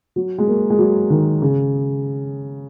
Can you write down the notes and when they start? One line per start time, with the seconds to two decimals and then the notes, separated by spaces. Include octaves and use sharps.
0.16 F#3
0.38 G#3
0.47 A#3
0.70 G#3
0.79 F#3
1.10 D#3
1.42 C#3